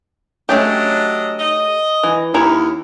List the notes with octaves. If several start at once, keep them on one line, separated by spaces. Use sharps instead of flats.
F#3 A3 C#4 D4 G4 D#5
D#5
E3
D#2 C#4 E4 A#5